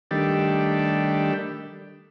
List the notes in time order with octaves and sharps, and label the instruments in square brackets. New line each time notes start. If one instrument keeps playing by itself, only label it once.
[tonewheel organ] D#3 G3 [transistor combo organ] A3 D4 G4